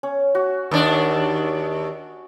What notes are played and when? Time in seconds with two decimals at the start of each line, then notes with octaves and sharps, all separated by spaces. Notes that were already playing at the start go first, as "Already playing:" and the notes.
0.03 C#4
0.35 F#4
0.71 D#2 D4